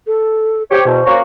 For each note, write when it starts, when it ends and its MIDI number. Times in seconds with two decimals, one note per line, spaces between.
0.07 0.63 69
0.71 0.82 67
0.71 1.18 72
0.71 0.82 73
0.85 1.00 40
0.85 1.00 47
1.06 1.21 58
1.06 1.21 61
1.06 1.21 66